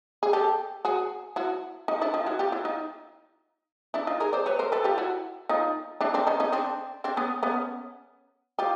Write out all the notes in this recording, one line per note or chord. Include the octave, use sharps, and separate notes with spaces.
G#4
G4 A4
F#4 G#4
E4 F#4
D#4 F4
D4 E4
D#4 F4
E4 F#4
F4 G4
E4 F#4
D#4 F4
D4 E4
D#4 F4
G#4 A#4
C5 D5
B4 C#5
A#4 C5
A4 B4
F4 G4
E4 F#4
D#4 F4
D4 E4
C4 D4
C#4 D#4
C#4 D#4
C4 D4
C4 D4
B3 C#4
B3 C#4
F4 G4